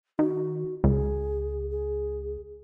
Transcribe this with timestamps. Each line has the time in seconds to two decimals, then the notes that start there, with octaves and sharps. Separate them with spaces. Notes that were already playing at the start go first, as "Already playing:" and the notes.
0.19 D#3 F#4
0.84 C#2 G#4
1.71 G#4